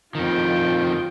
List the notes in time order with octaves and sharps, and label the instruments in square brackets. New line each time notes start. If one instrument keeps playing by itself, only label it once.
[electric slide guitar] F2 D#3 [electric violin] F4 G5